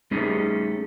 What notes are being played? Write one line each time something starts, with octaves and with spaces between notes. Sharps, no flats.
G3 A3 C#4 D#4 G#4